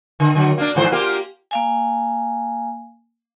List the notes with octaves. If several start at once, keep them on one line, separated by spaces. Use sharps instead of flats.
D3
D3 F#3
A#3 D4
G#2 E3 C5
A#3 F4 G4
A#3 F5 G#5